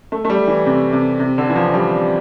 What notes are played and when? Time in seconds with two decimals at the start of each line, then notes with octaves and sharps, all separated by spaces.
0.12 A3
0.25 A3
0.30 G3
0.47 E3
0.66 C3
0.93 C3
1.20 C3
1.38 D3
1.49 E3
1.56 F3
1.73 G3